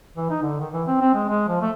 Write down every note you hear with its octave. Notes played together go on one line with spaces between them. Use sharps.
E3
D#4
D3
D#3
E3
C4
C4
G#3
G#3
F3
A3